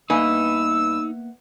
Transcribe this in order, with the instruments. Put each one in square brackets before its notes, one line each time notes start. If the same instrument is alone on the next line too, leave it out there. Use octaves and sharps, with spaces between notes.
[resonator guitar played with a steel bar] G2 B4 G#5 [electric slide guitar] A#3 B3 E5 [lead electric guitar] D#4 [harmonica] E6